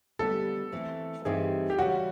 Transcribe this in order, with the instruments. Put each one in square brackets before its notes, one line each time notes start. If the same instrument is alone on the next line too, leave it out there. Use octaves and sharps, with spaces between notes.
[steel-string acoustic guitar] D3 G3 B3 [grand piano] A4
[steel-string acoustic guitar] E3 A3 C4
[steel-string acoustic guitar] G2 E3 G3 C4 D#4 [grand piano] G#4
[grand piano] G4
[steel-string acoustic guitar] C#3 E3 G3 [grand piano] F#4